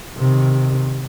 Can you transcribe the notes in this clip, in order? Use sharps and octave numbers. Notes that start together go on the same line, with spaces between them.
C3 D#3